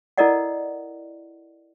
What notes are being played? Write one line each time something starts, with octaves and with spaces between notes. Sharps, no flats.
E4 A4 A#4 D5 D#5 F#5